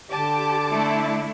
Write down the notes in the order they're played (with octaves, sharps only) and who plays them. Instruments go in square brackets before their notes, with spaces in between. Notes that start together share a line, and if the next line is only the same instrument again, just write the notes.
[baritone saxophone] D3 [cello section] G4 [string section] A5 D6
[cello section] A3 D4 E4